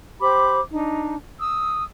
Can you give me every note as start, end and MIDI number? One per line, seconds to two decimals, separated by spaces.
0.21 0.59 67
0.21 0.59 72
0.21 0.59 83
0.21 0.59 86
0.71 1.15 62
0.71 1.15 63
1.40 1.83 87
1.40 1.83 88